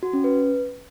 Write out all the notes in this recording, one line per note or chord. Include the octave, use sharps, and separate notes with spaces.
F#4
C#4
B4